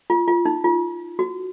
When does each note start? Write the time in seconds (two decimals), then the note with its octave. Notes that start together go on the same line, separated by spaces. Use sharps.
0.10 F4
0.28 F4
0.45 D#4
0.64 F4
1.19 F#4